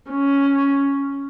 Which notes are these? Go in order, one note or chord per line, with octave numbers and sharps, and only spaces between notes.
C#4